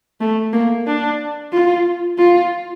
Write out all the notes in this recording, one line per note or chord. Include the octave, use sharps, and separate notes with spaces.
A3
A#3
D4
F4
F4